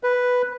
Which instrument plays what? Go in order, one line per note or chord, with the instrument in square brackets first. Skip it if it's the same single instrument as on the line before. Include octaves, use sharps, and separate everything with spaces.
[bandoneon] B4